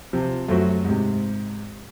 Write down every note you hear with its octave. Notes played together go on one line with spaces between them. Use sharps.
C3 F3
F#2 A3 C4 F#4
G#2 C3